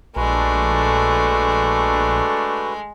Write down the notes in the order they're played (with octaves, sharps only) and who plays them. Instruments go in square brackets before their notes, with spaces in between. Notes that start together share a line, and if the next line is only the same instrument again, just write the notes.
[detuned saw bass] A#1 [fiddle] G#3 [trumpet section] A3 D4 A4 [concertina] F#4 B4